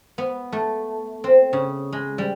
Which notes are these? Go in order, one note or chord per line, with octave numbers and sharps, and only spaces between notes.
B3
A3
C4
C#3
G#3
G3